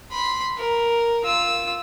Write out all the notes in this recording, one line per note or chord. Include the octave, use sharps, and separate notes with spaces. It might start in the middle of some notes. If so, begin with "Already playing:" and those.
B5 C6
A#4
F4 E6